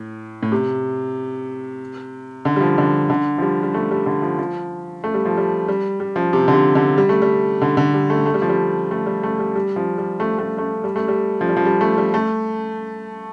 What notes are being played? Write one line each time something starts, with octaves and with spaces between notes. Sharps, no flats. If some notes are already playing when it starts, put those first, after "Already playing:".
Already playing: A2
A2
C3
D3
G3
F3
D3
D3
F3
G3
G3
A3
G3
D3
F3
F3
A3
G3
F3
G3
G3
G3
F3
C3
D3
C3
D3
G3
A3
G3
D3
D3
G3
A3
A3
G3
F3
G3
A3
G3
A3
G3
G3
F3
G3
A3
A3
A3
G3
A3
G3
F3
G3
F3
G3
A3
G3
A3